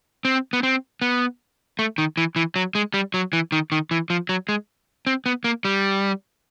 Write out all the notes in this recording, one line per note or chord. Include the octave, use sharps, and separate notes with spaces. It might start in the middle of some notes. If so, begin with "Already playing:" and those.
C4
B3
C4
B3
A3
D#3
E3
E3
F#3
G#3
G3
F#3
E3
D#3
D#3
E3
F3
F#3
G#3
C4
B3
A#3
G3